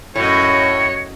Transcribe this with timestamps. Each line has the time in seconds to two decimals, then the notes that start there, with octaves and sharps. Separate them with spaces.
0.16 F#2 A2 F#4 C#5 D#5